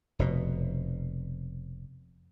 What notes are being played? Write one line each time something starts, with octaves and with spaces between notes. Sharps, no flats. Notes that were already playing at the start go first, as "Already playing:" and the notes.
F1 B2